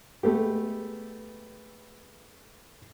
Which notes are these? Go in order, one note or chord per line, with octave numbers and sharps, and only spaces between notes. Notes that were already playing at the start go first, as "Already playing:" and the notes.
G#3 A3 B3 G4